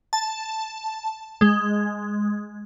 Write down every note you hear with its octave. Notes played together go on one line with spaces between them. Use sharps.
A5
G#3